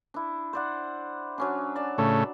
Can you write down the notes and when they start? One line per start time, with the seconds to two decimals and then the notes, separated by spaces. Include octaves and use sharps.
0.14 D4 E4
0.53 C5 D5 F#5
1.38 F#3 C#4 D4
1.76 D5 G#5 A5
1.98 A2 C#3 A3